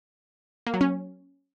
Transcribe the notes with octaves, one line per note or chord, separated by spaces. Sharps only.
A#3
F#3
C#4